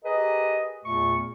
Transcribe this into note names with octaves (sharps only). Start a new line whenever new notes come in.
G4 G#4 A#4 B4 D#5
E2 A#2 A3 C#6